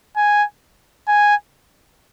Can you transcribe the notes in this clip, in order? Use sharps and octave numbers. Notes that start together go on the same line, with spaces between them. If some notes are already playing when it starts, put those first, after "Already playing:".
G#5
G#5